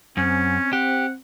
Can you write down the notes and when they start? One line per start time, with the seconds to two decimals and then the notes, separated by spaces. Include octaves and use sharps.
0.17 F#2 C4 C#4
0.73 G4 F#5